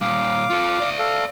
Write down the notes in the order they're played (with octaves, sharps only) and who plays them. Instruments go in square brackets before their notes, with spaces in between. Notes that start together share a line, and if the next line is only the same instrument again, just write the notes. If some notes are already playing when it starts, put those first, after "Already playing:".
[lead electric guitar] A#2 G3 [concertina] F5 D6
[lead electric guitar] F4 A4
D5 E5
[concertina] A4 F5